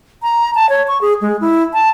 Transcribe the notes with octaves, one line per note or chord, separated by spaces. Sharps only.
A#5
A5
C#5
C#6
G#4
G#3
E4
A5